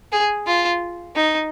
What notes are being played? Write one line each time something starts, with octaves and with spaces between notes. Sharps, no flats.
G#4
F4
D#4